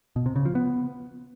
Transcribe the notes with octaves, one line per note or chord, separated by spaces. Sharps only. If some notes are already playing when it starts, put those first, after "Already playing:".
B2
C3
C#3
F3
B3